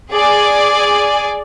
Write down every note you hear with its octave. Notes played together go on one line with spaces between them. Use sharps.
G#4 D5 G#5